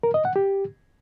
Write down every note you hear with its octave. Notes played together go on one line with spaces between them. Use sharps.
A#4
D#5
F#5
G4